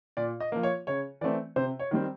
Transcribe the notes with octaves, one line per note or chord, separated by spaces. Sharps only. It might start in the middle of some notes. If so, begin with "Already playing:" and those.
A#2 D5
D#5
F3 A#3
C#5
C#3 C#5
E3 A3 C4 D5
C3 C5
C#5
D#3 G3 C4